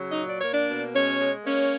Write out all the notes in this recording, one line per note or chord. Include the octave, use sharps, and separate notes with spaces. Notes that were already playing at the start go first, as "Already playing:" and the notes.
Already playing: C#3 F#3
D#4 D#5
A#2
D5
A#3 C#5
D4 D5
B2
G#3 C#4 C#5
G#3
A#3 C#4 C#5